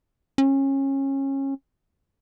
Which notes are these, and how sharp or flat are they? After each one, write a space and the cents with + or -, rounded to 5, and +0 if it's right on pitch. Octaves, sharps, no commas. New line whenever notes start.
C#4 -25